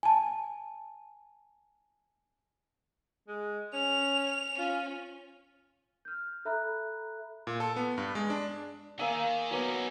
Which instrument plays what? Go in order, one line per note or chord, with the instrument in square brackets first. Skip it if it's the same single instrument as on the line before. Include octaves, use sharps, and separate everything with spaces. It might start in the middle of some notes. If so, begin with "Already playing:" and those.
[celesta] G#5 A5
[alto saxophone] G#3
[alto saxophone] C#4 [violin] F7
[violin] C#4 [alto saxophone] F4
[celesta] F6 G6
A4 E5 A#5 B5 F#6
[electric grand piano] A#2
A4
B3
G2
G#3
D4
[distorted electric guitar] D#3 [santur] A#3 E5 G#5
[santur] F#3 B3 D6 [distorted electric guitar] C#4 D#4